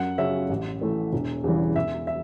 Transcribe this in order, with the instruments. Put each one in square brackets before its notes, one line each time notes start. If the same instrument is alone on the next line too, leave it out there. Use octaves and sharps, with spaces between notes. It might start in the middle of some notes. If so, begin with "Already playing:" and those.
Already playing: [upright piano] F#2 F#5
C#3 F#3 C#4 E5
A1
A2 E3 A3
E1
E2 C#3 E3 G3
E1 E5
E5